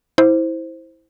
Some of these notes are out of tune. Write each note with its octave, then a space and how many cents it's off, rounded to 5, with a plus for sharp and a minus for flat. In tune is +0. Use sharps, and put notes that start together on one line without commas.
E4 -15 C5 +0